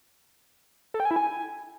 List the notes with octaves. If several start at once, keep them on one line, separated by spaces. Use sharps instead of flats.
A4
G5
G#5
E4
G#5